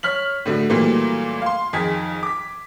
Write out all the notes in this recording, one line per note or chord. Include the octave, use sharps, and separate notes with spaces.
C#5 F6 B6 F#7
A2 D3 A3 F#4
A#2 E3 F#3 G3 A3 A#3
F5 C6
F2 D#3 G#4 G#6 B6
D6 B6